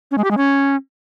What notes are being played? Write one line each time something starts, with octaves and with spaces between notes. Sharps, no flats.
C#4
G#3
G4
G#3
C#4